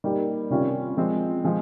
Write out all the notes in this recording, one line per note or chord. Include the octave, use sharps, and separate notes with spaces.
G3 A#3 D#4 G4
C3 D#3 G3 C#4 F4
F3 G#3 C4
F3 G#3 C4 F4